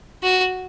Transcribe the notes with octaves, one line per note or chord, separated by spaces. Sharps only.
F#4